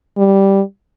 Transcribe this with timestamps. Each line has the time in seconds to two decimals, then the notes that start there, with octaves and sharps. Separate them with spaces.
0.17 G3